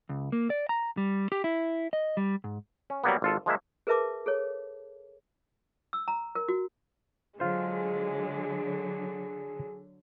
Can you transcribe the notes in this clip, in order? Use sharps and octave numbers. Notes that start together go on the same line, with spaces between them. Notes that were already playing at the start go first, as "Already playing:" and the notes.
C#2
A#3
D5
A#5
G3
G4
E4
D#5
G3
G#2
C#4
F#3 G3 A#3 B3
G#1 F4 A4
F3 G#3 A#3 E5
G#4 A#4 B4 E5 A5 D6
G#4 A4 C#5
E6
A#5
A#4
F#4
D3 F#3 G#3 F4 G#4 C5